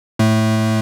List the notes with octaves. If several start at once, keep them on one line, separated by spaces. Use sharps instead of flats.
A2 A3